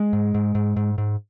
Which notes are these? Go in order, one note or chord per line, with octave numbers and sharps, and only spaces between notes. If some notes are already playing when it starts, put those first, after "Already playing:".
Already playing: G#3
G#2
G#2
G#2
G#2
G#2